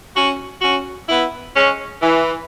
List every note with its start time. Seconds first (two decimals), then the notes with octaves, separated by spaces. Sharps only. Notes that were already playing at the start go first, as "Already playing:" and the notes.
0.15 C#4 F#4
0.62 C#4 F#4
1.09 B3 E4
1.55 G#3 C#4
2.02 E3